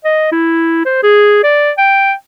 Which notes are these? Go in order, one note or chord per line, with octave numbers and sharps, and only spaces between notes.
D#5
E4
C5
G#4
D5
G5